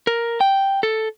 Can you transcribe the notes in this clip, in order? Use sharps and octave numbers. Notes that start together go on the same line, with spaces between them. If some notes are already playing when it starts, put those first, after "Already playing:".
A#4
G5
A4